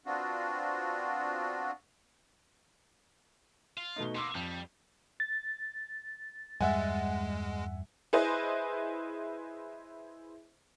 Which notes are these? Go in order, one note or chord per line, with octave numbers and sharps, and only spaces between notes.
B3 C4 D4 F4 F#4
F4
B2 A3 D#4
A#3 B3 C6 D6 E6
F2 G3
A6
E2 G2 G3 G#3 E5 F#5 G#5
E4 G#4 B4 C5 D#5